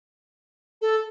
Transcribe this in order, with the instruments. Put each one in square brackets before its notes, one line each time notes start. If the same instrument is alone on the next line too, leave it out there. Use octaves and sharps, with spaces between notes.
[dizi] A4